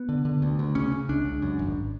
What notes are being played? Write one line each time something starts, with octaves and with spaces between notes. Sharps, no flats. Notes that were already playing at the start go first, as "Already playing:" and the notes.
Already playing: B3
D3
D3
D2
D2
C#3 C#4
C#3
C#2 D4
C#2
F#2
G#1